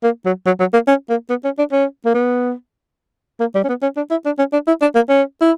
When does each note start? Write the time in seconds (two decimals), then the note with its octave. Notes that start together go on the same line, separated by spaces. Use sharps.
0.04 A#3
0.25 F#3
0.46 F#3
0.60 F#3
0.74 A#3
0.88 C#4
1.10 A#3
1.30 B3
1.45 C#4
1.59 D4
1.72 C#4
2.06 A#3
2.15 B3
3.40 A#3
3.55 G3
3.64 C#4
3.69 B3
3.83 C#4
3.97 D4
4.11 E4
4.26 D4
4.39 C#4
4.53 D4
4.67 E4
4.82 D4
4.95 A#3
5.09 C#4
5.42 E4